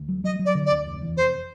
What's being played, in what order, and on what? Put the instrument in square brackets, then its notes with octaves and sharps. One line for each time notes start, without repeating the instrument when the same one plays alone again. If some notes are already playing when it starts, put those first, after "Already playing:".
Already playing: [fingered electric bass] D2
F#3
[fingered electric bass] F#3 [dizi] D#5
[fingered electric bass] F#3
[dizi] D5
[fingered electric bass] D3
[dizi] D5
[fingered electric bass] D2
F1
E2
[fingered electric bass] F1 [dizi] C5